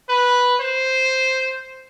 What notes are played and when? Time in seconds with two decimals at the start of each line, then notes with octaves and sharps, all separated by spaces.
0.09 B4
0.60 C5